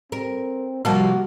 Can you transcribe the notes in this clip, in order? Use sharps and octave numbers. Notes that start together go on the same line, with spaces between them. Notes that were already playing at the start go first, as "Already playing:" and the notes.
C4 A#4
C3 F3 G3 A#3 F#4 A#4 A5